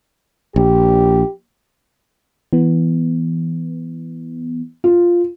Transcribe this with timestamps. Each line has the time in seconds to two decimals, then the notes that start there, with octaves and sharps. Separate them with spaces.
0.56 A#1 G4
2.53 E3 B3
4.84 F4